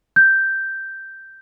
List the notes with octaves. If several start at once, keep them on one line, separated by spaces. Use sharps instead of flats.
G6